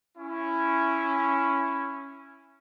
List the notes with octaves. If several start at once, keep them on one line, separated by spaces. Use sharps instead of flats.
C#4 E4